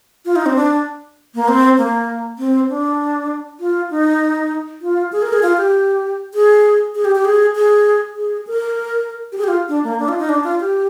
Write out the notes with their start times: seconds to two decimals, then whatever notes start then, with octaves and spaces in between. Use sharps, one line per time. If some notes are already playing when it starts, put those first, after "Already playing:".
0.25 F4
0.36 D#4
0.46 C4
0.56 D4
1.35 A#3
1.48 C4
1.78 A#3
2.39 C4
2.70 D4
3.60 F4
3.91 D#4
4.82 F4
5.12 G#4
5.22 A#4
5.33 G#4
5.43 F4
5.57 G4
6.34 G#4
6.95 G#4
7.05 G4
7.15 G4
7.25 G#4
7.56 G#4
8.16 G#4
8.47 A#4
9.32 G4
9.38 G#4
9.44 G4
9.48 F4
9.69 D4
9.84 A#3
9.99 D4
10.09 F4
10.19 D#4
10.29 D4
10.44 F4
10.60 G4